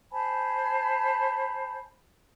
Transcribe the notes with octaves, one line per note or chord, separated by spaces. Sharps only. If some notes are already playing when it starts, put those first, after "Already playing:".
C5 G#5 A5 B5